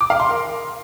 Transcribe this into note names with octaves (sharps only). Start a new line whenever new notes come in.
D6
F5
C6
A#4